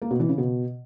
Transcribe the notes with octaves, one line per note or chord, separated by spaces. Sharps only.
A#3
B2
E3
C#3
B2